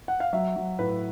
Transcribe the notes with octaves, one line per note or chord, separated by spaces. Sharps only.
F#5
F5
F#3 E5
F#3
A2 B4